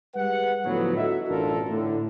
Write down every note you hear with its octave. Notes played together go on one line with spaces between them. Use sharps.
G3 G#3 B4 F#5
A2 D3 F3 F#3 B3
F#4 A4 D#5 E5
A1 B2 D4 F4 A4 A#4
A2 D3